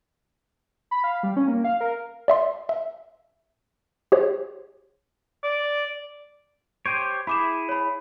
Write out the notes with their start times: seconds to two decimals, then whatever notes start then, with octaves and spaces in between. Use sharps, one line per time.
0.91 B5
1.04 F5
1.23 G3
1.36 C#4
1.48 A#3
1.64 F5
1.81 A#4
2.28 D5 E5 C6
2.69 E5
4.12 G4 G#4 C5 C#5
5.43 D5
6.86 G4 C5 C#5 D7 D#7
7.27 E4 G#4 B5 D6 E7
7.69 C#5 B5